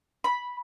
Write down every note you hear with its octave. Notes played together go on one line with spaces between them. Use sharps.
B5